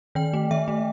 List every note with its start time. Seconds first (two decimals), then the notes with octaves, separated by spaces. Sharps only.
0.15 D#3 G5
0.33 A3
0.51 D#3 E5
0.68 A3